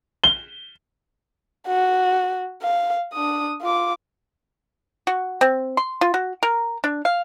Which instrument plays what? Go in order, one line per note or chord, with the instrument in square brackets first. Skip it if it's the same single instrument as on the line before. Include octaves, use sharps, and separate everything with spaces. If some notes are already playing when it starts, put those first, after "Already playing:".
[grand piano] G7
[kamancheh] F#4
F5
D4 D#6
F4 D6
[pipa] F#4
C4
C6
F4
F#4
A#4
D4
F5